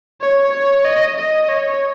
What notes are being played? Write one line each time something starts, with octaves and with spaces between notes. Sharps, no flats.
C#5
C#5
D#5
D#5
C#5